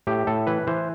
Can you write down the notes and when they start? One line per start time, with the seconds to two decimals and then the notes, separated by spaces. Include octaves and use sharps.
0.07 A2 G4
0.27 A2 A4
0.47 E3 B4
0.67 E3 C5